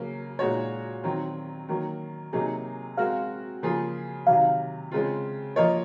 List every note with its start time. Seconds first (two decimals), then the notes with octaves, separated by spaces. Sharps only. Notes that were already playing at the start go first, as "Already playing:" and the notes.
Already playing: C#3 F#3 A#3
0.39 A#2 G#3 D#4 F#4 C#5
1.04 D#3 F#3 C4
1.69 D#3 F#3 A#3
2.33 C3 F#3 A#3 D#4 G#4
2.97 G#3 C4 F#4 A#4 F5
3.63 C#3 F3 A#3 F4 G#4
4.27 C3 D#3 F#3 F5
4.92 C#3 G#3 C4 F4
5.56 F3 A#3 F4 A#4 C#5 D#5